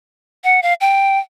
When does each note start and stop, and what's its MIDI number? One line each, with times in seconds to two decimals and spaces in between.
0.44 0.60 78
0.63 0.74 77
0.81 1.19 79